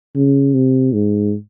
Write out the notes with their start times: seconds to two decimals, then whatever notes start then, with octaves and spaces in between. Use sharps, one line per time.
0.15 C#3
0.54 C3
0.93 G#2